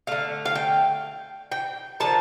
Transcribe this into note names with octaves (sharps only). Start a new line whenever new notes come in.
D3 A3 F5
F5
G5
G5
D3 F3 A#3 A5